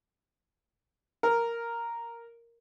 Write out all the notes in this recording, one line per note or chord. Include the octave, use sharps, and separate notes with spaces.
A#4